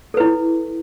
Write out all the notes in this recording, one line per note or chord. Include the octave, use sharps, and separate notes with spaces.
E4 A4 B4